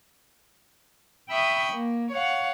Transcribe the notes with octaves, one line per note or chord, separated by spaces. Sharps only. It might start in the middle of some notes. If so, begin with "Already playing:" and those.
E5 G5 B5 C#6 D#6
A#3
C#5 F5 F#5